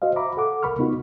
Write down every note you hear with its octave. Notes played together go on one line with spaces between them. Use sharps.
F#4 C5 D#5 F5
E5 A#5 B5 D6
A4 F#5 D6
C2 A#4 B5 C#6 F6
C3 B3 D#4 F4 F#4